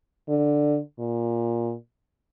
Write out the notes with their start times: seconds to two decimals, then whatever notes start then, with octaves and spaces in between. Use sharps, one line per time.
0.29 D3
0.99 A#2